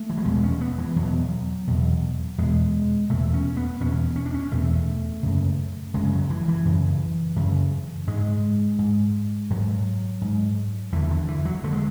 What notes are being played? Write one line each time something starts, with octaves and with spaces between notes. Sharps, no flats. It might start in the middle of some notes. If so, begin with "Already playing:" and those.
Already playing: A3
E3
F#3
E2 B2 G#3
C#4
B3
E3
E2 B2 F#3
E2 B2
E2 B2 G#3
E2 B2 A3
C#4
B3
E2 B2 C#4
C#4
D4
C#4
E2 B2 A3
F#2 C#3
F#2 C#3 G#3
F#3
E3
E3
F#2 C#3
F#2 C#3
G#2 G#3
G#2
G#2 F#3
G#2
E2 D3 E3
D3
E3
F#3
D3 A3
G#3